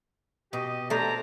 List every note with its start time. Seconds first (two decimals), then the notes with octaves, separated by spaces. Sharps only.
0.53 B2 G4 D#5
0.90 C3 A3 D4 C5 A#5